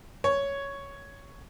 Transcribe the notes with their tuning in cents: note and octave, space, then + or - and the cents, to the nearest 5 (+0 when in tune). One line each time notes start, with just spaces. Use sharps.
C#5 +5